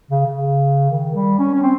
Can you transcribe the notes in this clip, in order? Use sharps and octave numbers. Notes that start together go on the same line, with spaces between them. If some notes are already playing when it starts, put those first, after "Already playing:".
C#3
C#3
D#3
G3
C#4
C#4
C4